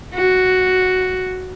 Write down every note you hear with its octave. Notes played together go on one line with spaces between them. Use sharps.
F#4